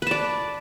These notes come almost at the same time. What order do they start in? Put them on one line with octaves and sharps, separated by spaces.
B4 A5 D5